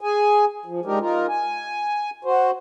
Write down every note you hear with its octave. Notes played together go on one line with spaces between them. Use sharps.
G#4 G#5
F3
G#3 D4 D#4 G4 A#4
D#4 F4 A#4
G#5
F#4 C5